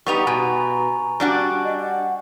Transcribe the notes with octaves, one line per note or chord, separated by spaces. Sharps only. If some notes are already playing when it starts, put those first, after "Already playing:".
G3 B3 D#4 G4 C#6 F7
B2 G#5 A#5
G3 D4 F#4
D#5
F#5